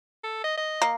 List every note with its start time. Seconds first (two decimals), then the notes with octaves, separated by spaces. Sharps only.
0.23 A4
0.44 D#5
0.57 D#5
0.82 A#3